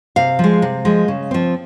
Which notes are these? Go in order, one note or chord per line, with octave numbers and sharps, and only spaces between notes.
C3 F5
F3 G#3
C3
F3 G#3
C#3
F3 C4